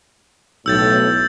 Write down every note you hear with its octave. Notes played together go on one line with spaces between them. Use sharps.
B1 A2 E6 G6 A6